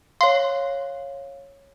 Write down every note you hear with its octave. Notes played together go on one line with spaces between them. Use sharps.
C#5 F5 C6